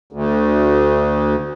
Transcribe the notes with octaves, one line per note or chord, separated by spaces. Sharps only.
D2